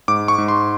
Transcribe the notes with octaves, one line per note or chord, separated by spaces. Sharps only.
G#2 D6
C#6
G#2
C6